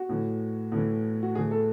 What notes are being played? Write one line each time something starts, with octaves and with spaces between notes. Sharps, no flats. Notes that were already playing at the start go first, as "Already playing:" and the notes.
Already playing: F#4
A2 E3
A2 E3
F#4
A2 E3 G#4
A4